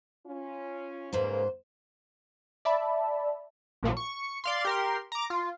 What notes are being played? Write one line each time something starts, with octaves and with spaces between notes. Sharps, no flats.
C#4 F4
G#2 C#3 A#3 B4 C5
D5 E5 A5 B5
A#1 A#2 F3 F#3
C#6
D5 F5 C6
G4 A#4 C6
A#5 D6
F4